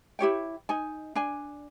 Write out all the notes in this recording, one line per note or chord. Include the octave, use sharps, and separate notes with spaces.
E4 G4 C#5 G5
D#4 G#5
D4 G#5